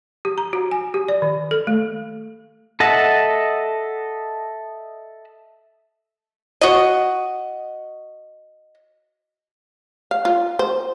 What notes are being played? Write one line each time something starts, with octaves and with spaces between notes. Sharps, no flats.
G4
A#5
F#4
G#5
G4
D5
D#3
A4
A3
A4 D#5 E5 F#5 A5
F#4 D#5
F5
F4
C5